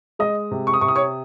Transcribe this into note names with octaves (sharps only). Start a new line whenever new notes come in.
G#3 D#5 D#6
C3
C#6
D#6
C3 C#6
D#6
C#5 C#6